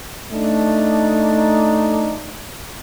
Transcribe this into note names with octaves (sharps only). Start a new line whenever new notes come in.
A3 D4 D#4